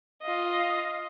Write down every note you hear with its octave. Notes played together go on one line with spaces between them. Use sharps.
F4 D#5